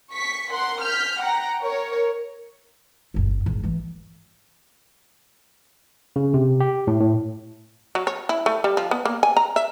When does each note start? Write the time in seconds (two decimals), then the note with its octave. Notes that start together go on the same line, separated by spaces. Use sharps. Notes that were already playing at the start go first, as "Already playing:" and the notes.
0.12 C#6 B6
0.51 A#4 F#5 C6
0.82 F6 G6 B6
1.19 F#5 G5 A#5
1.62 A#4 C#5
3.14 G1 C#2
3.46 G#1 D#2
3.63 E3 A3
6.16 C#3
6.34 C3
6.60 G4
6.87 A2
7.00 A2
7.95 F#3
8.07 C#5
8.29 E4
8.46 A3
8.64 G3
8.77 F3
8.91 B3
9.05 A#3
9.23 G#5
9.37 A#5
9.56 E5